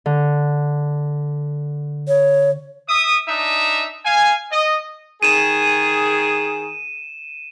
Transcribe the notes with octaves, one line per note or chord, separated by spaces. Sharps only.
D3
C#5
E5 D#6
D4 D#4 E5
F5 G#5
D#5
D#3 G#4 D#7 E7